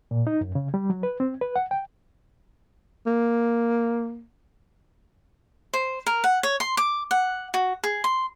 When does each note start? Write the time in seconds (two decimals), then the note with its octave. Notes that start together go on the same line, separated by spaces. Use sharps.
0.11 A#2
0.27 D#4
0.41 F#2
0.55 C#3
0.74 G3
0.90 F#3
1.03 B4
1.20 C4
1.41 B4
1.56 F#5
1.71 G5
3.07 A#3
5.74 C5
6.06 A#4
6.24 F#5
6.43 C#5
6.60 C6
6.77 D6
7.11 F#5
7.54 F#4
7.84 G#4
8.04 C6